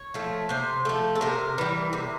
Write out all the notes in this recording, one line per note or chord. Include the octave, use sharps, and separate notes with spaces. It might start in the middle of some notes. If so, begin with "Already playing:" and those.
Already playing: C#5
F3 A3
C3 C5
F3 A3
A4
C3 A#4
E3 G3
C3